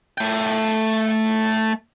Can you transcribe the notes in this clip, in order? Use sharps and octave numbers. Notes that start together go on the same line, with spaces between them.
A3 G5